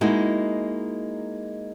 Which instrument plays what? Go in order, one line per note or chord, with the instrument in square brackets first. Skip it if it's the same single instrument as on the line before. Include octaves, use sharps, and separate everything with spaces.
[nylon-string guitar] G#3 A#3 D#4 E4 F#4